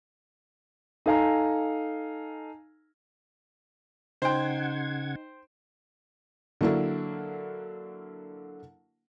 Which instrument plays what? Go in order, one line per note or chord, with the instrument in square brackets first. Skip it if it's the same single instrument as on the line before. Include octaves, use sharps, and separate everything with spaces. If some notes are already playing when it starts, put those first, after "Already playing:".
[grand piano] D#4 A4 F5 G#5 A#5
[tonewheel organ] C#3 F#5 G#6 [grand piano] D#4 [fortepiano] C5 G5
[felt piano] D3 F#3 A#3 D4 E4